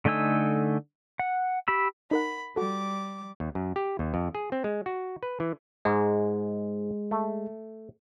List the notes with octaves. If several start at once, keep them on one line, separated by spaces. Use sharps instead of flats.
D3 A3 D#4 G#5 E6
F#5
G4 B5 E6
D#4 A#4 F#5 B5
G3 F#4 A4 D6
D#2
F#2
G4
D#2
F2
G#4
C4
G#3
F#4
B4
E3
G#2 G#3
A3